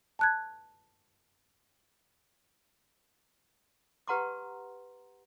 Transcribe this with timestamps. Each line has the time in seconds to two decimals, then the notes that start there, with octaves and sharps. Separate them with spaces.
0.19 A5 F#6 G#6
4.08 G4 B4 F#5 A#5 C6 D6